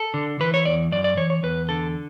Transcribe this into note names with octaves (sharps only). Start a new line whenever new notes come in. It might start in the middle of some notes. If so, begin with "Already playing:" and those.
Already playing: A4
D3
E3 B4
C#5
E2 D5
F#2 D5
D5
E3 C#5
C#5
E2 B4
D3 A4